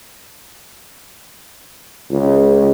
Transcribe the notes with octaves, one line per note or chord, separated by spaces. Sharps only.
C#2